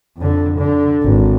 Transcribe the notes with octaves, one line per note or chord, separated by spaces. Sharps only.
F2 D3
D3
G#1